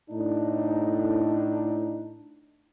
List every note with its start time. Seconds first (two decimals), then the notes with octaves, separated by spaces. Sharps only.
0.10 A2 D4 D#4